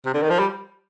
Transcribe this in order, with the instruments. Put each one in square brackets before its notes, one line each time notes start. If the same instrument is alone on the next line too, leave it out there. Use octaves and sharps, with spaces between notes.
[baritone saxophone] C3
D3
D#3
F3
G3